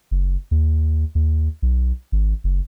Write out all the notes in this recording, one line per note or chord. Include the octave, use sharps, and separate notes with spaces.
F#1
D#2
D#2
B1
G#1
F#1